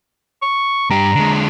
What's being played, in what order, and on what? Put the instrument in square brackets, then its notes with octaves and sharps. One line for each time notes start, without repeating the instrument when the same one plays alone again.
[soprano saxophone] C#6
[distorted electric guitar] G2 G4 [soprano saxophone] A#5
[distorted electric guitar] D3 G#3